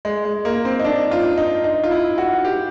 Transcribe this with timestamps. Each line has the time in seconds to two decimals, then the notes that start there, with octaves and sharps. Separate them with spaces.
0.05 G#3
0.25 G#3
0.45 A#3
0.65 C4
0.80 D#4
0.85 D4
1.11 F4
1.38 D#4
1.64 D#4
1.84 F4
1.91 E4
2.18 F#4
2.45 G4